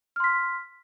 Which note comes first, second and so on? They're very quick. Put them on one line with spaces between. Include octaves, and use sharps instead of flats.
F6 C6 B6